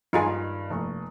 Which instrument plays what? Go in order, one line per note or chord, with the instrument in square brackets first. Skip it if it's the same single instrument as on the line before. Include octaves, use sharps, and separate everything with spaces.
[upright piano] G2 D#3 [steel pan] D#4 F4 G#4
[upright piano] F1 A#3 C#6